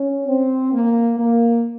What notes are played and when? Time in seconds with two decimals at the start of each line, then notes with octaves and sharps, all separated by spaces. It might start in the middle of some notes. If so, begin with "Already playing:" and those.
Already playing: C#4
0.28 C4
0.73 A#3
1.18 A#3